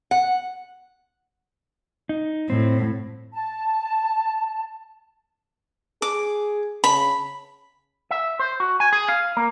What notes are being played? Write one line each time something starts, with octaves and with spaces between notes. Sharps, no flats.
F#5
D#4
A2 C4
A5
G#4 D6
C#3 B5
E5
C5
F#4
G#5
G#4
F5
A#3